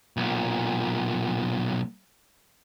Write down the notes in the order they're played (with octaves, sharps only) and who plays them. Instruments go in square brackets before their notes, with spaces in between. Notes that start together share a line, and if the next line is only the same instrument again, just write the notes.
[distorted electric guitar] B1 A#2